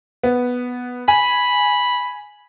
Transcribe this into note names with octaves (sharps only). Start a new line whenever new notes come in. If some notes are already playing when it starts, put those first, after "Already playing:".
B3
G#5 B5